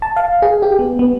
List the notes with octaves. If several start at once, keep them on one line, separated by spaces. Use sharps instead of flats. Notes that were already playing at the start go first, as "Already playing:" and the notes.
A5
F5
G#4
G4
B3
B3